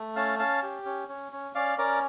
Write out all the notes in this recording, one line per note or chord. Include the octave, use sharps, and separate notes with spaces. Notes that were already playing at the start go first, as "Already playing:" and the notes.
Already playing: A3
C#4 F5 A5
C#4 F5 A5
G4
C#4
C#4
C#4
C#4 D5 F5
C#4 A#4 D5